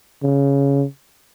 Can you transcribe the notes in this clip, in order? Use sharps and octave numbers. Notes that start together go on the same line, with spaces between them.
C#3